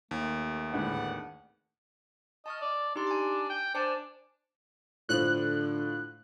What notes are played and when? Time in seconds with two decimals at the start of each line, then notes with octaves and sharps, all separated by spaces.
0.11 D#2 A3
0.73 G#1 A2 D3 G#3 B4 D5 F#5
2.46 D#5 A5 C#6 F6
2.62 D5
2.96 D4 D#4 G4 C6
3.07 G#5 D6
3.50 G5
3.75 D4 C5 G#5 A5
5.09 A2 D3 F3 F#6